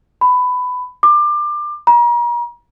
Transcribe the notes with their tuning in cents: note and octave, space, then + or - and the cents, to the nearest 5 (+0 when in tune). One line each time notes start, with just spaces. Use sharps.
B5 +15
D6 +25
A#5 +40